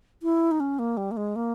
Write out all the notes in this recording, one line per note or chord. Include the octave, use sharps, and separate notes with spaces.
E4
D#4
C#4
A#3
G3
A#3
G#3
A#3